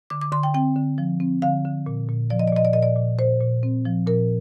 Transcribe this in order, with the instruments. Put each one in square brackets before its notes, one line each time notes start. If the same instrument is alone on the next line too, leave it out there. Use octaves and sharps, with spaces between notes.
[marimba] D3 D6
D6
D3 C6
G5
C4 G5
D3
F3
C4
D3 F5
D3
A#2
A#2
F3 D5
D#5
D5
A#2 D#5
D5
A#2 D#5
D5
A#2
A#2 C5
A#2
C4
F3
A#2 A#4